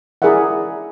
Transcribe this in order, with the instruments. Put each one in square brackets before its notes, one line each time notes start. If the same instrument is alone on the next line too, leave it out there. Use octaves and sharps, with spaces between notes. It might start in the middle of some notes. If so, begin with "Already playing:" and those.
[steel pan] E4 G#4 A#4 D5 E5 F#5